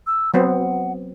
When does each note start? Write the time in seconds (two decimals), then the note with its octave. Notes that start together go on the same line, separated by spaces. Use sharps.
0.07 E6
0.34 F#3 B3 C4 F#5